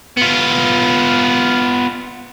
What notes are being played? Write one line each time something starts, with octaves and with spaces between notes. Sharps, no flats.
B3 F4